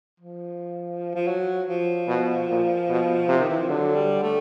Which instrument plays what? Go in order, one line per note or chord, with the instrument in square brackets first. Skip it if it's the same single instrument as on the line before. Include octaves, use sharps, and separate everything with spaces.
[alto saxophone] F3
F3
F#3
F3
[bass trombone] B2
A#2
B2
C3
[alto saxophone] D#3
E3
F3
[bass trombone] D3 [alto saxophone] F#3
[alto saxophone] G3
A3